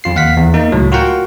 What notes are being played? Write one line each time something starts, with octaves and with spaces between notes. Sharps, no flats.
F2 F4 C7
D#2 F5 F#5 B6
E2
A#3 D#4
C#2 A2 F#3
F4 F#4 A#4 F#5 G5